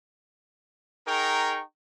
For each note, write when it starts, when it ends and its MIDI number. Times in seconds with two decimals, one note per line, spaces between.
1.07 1.61 63
1.07 1.61 68
1.07 1.61 70
1.07 1.61 79
1.07 1.61 82
1.07 1.61 85